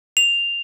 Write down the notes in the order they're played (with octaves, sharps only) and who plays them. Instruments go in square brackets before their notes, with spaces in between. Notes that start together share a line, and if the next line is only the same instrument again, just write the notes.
[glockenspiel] F7